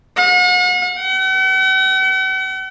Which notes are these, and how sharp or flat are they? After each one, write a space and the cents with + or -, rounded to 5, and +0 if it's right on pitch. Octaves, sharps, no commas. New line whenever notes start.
F#5 -40
F#5 +45